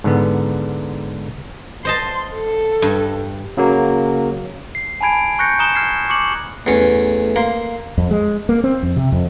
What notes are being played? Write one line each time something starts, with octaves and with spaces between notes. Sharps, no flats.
G#2 D3 B3
C5 D#5 A5 C6
A4
G2
C#3 F#3 A#3
C7
G#5 A5 B5 G#6 D7
C#6 F#6 G6 A#6 C#7
A#5 D#6 F#6 E7 G7
F6 G#6 C7
C#6 D6 C#7 F#7
E2 A3 C#4
A#3 C6
F2
G#3
A#3
C4
F2
C3
F2